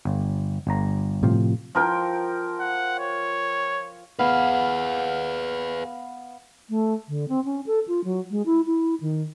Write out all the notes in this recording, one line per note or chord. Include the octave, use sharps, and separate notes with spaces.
G1
G1 A#5
A2 C3 F3
F3 A#4 G5
F#5
C#5
B3 G#4 B4 F5
A3
D3
C4
C#4
A4
F4
F#3
G#3
E4
E4
D#3